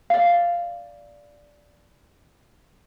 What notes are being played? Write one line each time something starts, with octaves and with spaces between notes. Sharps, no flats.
D5 F5